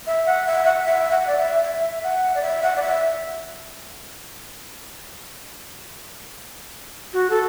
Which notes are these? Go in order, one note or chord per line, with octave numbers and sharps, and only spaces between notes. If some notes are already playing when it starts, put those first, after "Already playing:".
E5
F#5
E5
F#5
E5
F#5
D5
E5
E5
F#5
D5
E5
F#5
D5
E5
F#4
A4